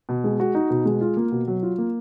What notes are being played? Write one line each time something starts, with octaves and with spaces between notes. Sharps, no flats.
B2
G#3
F#4
D#4
B2
G#3
F4
A#3
B2
F#3
F4
A#3